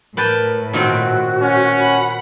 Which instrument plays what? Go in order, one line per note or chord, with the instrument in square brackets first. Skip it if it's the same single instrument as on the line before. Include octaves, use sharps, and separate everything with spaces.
[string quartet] A2 [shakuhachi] A#4 [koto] B4 G5 A5
[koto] A#2 D#3 C4 [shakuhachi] F#4
[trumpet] C#4
[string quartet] F#5 B5